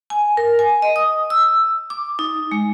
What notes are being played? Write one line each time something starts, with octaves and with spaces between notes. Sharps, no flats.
G#5
A#4
G#5
D#5
D#6
E6
D6
D#4
G#3